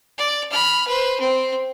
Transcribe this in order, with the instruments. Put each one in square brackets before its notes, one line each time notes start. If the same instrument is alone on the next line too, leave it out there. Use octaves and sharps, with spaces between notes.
[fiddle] D5
B5 F6
B4 C5
C4